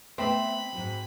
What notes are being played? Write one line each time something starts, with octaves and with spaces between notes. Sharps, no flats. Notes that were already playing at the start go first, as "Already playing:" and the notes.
A3 B3 C4 E5 B5
G#2 F#3